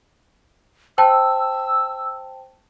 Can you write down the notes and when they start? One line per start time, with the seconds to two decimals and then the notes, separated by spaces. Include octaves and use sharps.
0.98 C5 G5 A5 E6